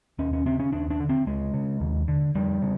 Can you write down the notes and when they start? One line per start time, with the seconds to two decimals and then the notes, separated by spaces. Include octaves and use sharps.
0.19 D#2 C#4
0.33 C#4
0.46 C#3 C4
0.59 C#4
0.73 D#2 D4
0.90 D4
1.00 D3
1.09 C4
1.27 C#2 G#3
1.54 C#3
1.80 D#2
2.08 D3
2.35 F2 G3
2.62 C#3